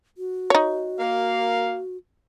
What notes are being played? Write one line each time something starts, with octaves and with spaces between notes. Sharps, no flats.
F#4
D#4 C#5
A#3 F5